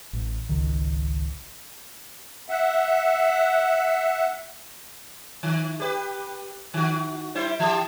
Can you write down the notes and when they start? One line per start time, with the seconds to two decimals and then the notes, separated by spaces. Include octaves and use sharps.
0.13 A1
0.49 G#1 C#2 D#3
2.49 E5 F#5
5.43 D#3
5.80 G4 B4
6.74 D#3 F#4
7.35 G3 E4 C5
7.60 E3 G4